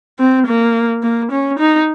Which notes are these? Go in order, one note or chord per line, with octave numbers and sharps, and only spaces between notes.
C4
A#3
A#3
C#4
D#4